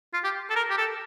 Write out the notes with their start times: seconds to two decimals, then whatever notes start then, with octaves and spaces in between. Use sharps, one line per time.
0.14 F4
0.24 G4
0.50 A4
0.56 A#4
0.70 G4
0.78 A4